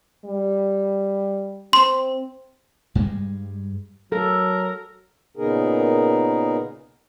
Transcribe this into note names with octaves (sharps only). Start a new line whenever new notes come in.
G3
C4 C6
G2 G3 G#3
F#3 A4 A#4
A#2 C#3 B3 D#4 G#4 A#4